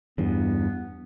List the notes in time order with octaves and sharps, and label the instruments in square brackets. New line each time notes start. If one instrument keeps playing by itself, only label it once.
[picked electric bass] E2 G2 [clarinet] B3